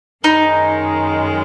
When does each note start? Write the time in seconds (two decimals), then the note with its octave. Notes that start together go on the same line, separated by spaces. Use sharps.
0.24 F#2 D#3 G#3 D#4